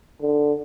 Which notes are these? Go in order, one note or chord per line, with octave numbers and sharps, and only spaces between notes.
D3